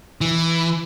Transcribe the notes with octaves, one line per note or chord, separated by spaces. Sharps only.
E3